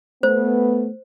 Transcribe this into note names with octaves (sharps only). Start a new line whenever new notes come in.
A3 B3 C5